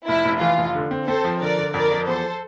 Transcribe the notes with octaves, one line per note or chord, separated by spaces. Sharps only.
F1 E4
F1
E3 F4
F1
D3
C4
C4 A4 C5
F3
D3 A#4 D5
D3
F2 A#4 D5
F3
E2 A4 C5